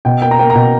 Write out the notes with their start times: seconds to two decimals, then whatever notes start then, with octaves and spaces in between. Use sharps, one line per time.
0.05 B2 G5
0.22 A#3 G5
0.31 A#5
0.39 A#3 G5
0.50 A#5
0.55 B2 G5